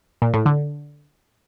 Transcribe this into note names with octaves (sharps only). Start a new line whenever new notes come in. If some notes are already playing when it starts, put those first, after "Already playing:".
A#2
A2
D3